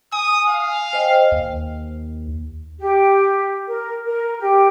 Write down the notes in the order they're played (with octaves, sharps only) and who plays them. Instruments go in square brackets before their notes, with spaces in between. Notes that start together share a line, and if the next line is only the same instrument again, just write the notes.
[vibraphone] G#5 [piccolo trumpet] D#6
[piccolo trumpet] F5
[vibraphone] C5 D#5 G5
[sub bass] D#2
[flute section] G4
A#4
A#4
G4